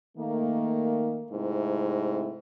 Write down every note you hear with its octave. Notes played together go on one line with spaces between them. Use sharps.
D#3 A3 A#3
G#2 C3 A3 C4 E4